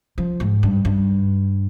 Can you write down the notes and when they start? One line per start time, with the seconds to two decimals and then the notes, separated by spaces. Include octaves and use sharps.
0.18 F3
0.40 G#2
0.63 G2
0.85 G2